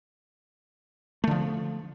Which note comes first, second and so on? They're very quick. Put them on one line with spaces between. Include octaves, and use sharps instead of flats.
A3 D3 F3